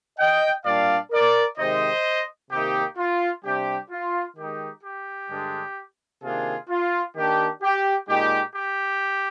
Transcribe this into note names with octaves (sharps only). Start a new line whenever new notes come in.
D#5 G5
A#2 G3 D4 D5 F5
A#4 D5
C3 D#3 G#3 D#4 C5 D#5
C3 D#3 A#3 D#4 G4
F4
C3 G3 D4 G4
F4
D#3 G#3 D#4 G4
G4
G2 D3 G#3 D4
C3 D#3 A#3 D4 F4 G#4
F4
D#3 A#3 D4 G4
G4
A#2 G#3 D#4 G4
G4